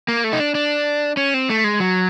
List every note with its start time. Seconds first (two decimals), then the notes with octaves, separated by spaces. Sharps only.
0.08 A#3
0.24 A3
0.33 D#4
0.40 D4
0.55 D4
1.17 C#4
1.34 C4
1.50 A3
1.64 G#3
1.80 F#3